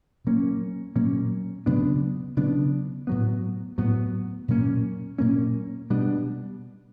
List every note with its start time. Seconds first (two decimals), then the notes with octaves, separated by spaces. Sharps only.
0.24 A#2 F#3 A#3 C#4
0.95 A#2 F#3 A#3 C#4
1.66 C#3 F#3 B3 D4
2.37 C#3 F#3 B3 D4
3.07 A2 F#3 B3
3.78 A2 F#3 B3
4.48 A#2 F#3 A#3 C#4
5.18 A#2 F#3 A#3 C#4
5.90 B2 G3 B3 D4